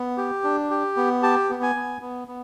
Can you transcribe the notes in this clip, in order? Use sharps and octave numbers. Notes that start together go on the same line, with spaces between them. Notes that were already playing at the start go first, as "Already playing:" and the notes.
Already playing: B3
G4
D4
G4
B3
G4 A5
B3
G#5
B3
B3
B3